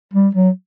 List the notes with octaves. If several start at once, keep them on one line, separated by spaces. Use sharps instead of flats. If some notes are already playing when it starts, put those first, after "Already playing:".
G3
F#3